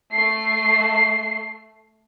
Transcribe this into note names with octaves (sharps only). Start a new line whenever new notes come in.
A3 C7